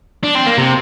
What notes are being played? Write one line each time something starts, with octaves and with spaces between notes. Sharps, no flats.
D4
C4
A#3
C3